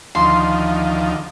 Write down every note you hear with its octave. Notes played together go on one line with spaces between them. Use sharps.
D2 D#3 F3 C6